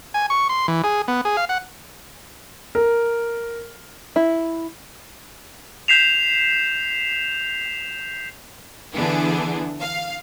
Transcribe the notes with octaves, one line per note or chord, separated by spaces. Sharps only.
G#5
C#6
C6
E3
G#4
B3
G#4
F5
F#5
A#4
E4
G6 B6 C7 E7 F7
D3 E3 B3 D4 G#4
F5